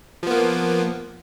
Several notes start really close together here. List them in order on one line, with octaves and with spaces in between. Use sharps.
F3 B3 A#3